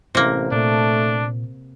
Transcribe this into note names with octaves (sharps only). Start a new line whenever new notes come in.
A1 C3 A#3 E4
A#2 A3 D4